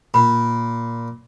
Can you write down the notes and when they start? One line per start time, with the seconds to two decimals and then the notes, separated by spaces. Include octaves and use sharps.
0.14 A#2 B5